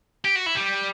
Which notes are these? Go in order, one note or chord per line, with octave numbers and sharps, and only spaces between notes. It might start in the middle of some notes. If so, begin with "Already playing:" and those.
G4
F#4
E4
G3